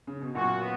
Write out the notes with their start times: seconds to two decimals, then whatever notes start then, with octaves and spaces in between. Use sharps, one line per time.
0.07 C#3
0.22 B2
0.35 F#2 A#2 F#4
0.61 B3